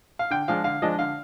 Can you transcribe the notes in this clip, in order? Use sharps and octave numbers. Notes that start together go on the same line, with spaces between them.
F5
D3 G5
F3 G#3 D4 F5
D3 F5
F3 G#3 D4 D#5
D3 F5